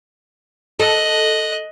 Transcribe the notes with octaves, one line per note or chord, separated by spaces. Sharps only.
A4 D#5 F#6